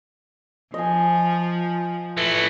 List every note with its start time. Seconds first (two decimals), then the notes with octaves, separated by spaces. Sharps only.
0.74 F3 D#5 G#5
2.17 E3 A3